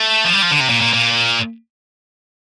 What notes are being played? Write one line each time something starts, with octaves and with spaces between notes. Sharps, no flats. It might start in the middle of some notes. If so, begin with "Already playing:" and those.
Already playing: A3
F3
G3
F3
D3
C3
A#2
A#2
A#2